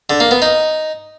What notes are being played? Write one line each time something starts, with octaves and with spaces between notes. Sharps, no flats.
D3
A#3
B3
D#4